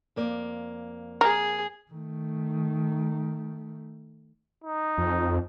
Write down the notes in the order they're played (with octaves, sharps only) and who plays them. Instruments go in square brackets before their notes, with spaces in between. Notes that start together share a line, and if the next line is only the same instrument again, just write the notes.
[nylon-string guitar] F2 A#3 D5
[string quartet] G#4 [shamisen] A#4
[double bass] D#3 A3
[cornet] D#4
[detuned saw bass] F2